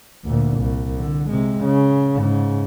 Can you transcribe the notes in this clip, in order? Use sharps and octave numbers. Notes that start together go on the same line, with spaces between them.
D2 A#2
C2
D3
C3 G#3
C#3
G#2 C#3